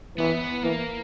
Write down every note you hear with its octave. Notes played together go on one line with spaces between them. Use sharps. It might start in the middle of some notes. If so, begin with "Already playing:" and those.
E3 B3
E3 A#3